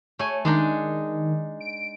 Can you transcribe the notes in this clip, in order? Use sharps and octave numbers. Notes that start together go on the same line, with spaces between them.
A3 C#5 G#5
D#3 G#3 D4 D#4
D7